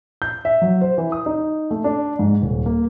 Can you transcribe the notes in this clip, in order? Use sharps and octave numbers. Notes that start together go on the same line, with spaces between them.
G6
E5
F#3
C5
E3
D#6
D#4
A3
D4
G#2
D#1
A#3